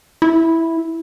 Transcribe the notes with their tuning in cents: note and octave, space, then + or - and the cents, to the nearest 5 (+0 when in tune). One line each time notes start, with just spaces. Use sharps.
E4 -5